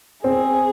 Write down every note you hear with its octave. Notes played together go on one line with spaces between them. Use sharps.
C4 G#4